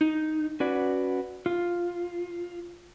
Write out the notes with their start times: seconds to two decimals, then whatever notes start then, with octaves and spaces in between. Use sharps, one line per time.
0.01 D#4
0.60 C#4 F#4 B4 D5
1.46 F4